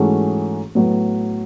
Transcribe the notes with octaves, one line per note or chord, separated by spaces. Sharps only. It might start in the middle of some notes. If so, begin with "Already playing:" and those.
Already playing: G#2 E3 A3 C#4 F#4
A2 F#3 B3